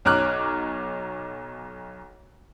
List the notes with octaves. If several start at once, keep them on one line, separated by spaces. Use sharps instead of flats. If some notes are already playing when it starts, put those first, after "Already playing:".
B1 C#5 A#5 D6 F6 F#6